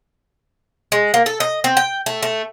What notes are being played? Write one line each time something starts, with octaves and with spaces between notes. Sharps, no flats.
G#3
A#3
A4
D#5
C4
G5
A3
A3